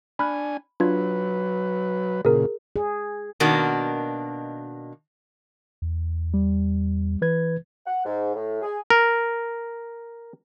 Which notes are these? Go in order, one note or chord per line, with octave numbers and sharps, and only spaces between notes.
D4 G#5 B5 F6 F#6
F#3 D4 F4 B4 G#6
A#2 C#3 G#4 A#4
G#4
B2 D#3 A#3 D4 F#4
E2
G3
E3 B4 G#6
F#5
G#2
A2
G#4
A#4